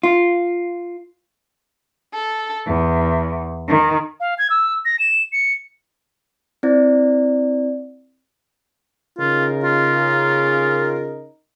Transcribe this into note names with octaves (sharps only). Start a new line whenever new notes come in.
F4
A4
E2
D#3
F5
G#6
E6
A#6
E7
C#7
C4 E4 D5
C#3 D#4 F4 A#4
F4